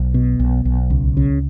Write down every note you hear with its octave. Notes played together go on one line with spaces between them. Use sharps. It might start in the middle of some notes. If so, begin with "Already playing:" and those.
Already playing: B1
B2
B1
B1
C#2
C#3